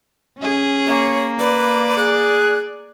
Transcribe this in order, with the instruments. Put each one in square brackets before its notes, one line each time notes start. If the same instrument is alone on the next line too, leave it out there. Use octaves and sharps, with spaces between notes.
[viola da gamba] C#4 G#4
[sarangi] A#3 [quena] C#5
[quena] B4 [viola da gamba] D5
[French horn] G#4 [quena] F#6